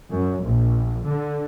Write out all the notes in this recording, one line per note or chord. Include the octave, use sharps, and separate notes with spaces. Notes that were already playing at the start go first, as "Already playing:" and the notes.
F#2
A#1
D3